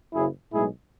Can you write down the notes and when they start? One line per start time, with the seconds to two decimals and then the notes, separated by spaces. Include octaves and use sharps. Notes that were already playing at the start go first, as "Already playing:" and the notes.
0.13 F#1 F#2 C#3 E4 G#4
0.52 B1 A2 G#3 E4 G#4